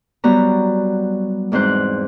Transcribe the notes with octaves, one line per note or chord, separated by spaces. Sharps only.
F#3 G3 B3 A#5
E2 G#2 C4 C5 F#6